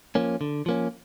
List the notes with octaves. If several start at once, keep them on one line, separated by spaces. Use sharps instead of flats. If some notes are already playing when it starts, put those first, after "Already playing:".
F3 A#3 C#4
D3
F3 A#3 C#4